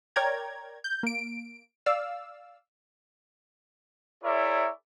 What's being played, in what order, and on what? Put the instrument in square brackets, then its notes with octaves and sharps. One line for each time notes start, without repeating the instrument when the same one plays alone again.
[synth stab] A#4 C#5 D5 G5 A#5 G#6
G6
A#3 D7
D5 F5 E6
[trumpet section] E4 G#4 A#4 C#5 D5 E5